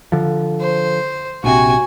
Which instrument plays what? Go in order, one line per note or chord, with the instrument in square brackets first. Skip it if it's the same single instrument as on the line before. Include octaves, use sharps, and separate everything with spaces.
[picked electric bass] D3 F3
[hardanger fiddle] C5
[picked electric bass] A#1 C3 [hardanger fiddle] F#4 G#5